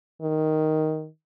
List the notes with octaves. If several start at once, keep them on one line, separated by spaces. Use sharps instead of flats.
D#3